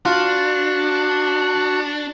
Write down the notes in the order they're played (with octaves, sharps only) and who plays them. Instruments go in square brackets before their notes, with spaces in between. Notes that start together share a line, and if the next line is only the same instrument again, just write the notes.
[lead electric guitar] D4 [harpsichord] F4 [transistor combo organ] F#4